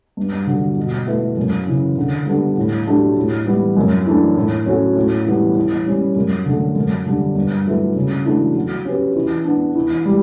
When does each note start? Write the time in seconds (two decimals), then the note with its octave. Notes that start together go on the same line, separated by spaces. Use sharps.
0.17 G2
0.47 D3 F#3
0.77 B2
1.07 A3 E4 B4
1.37 F#2
1.67 C#3 E3
1.97 D3
2.26 G3 B3 D4 A4
2.57 A2
2.87 F#3 A3 D4 G4
3.17 A2
3.46 E3 G3 B3
3.77 F#2
4.06 E3 A3 D4
4.36 A2
4.66 F#3 C#4 F#4 A4
4.96 A2
5.26 E3 G3 B3
5.57 E3
5.86 G3 C#4
6.16 F#2
6.46 D3 A3
6.76 F#2
7.06 D3 G3 D4
7.35 G2
7.66 F#3 A3 E4 B4
7.95 C#3
8.25 E3 A3 D4 F#4
8.55 F#3
8.85 C#4 G4 B4
9.15 E3
9.45 B3 D4
9.75 E3
10.06 G3